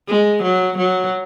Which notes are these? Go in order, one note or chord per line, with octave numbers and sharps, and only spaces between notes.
G#3
F#3
F#3